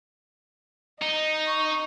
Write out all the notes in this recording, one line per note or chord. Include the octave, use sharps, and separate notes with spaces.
D#4 D#5
C#6